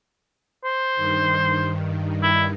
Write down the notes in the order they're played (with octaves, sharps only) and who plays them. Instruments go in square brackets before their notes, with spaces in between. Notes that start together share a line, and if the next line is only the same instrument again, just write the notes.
[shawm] C5
[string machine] G2 D#3
[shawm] E4